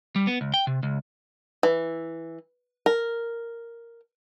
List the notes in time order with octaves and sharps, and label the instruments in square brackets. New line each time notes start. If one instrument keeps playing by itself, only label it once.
[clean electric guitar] G3
B3
C#2
G5
C3
C#2
[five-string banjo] E3
A#4